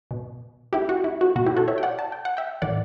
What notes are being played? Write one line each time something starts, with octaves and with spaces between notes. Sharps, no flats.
B2
E4 G4
F#4
E4
F#4
B2 F#4
E4 G4
F#4 A4
C#5 E5
G5
D5 F#5
A5
G5
F#5
E5 G5
A2 E3 D5 F#5